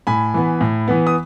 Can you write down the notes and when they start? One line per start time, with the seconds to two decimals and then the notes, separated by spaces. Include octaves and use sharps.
0.07 A2 G#5 B5
0.34 E3 B3
0.61 A2
0.88 E3 B3
1.07 D#6